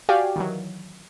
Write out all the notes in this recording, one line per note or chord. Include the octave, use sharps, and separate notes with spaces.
F#4 G4 D5 F5 G5 G#5
D#3 E3 F#3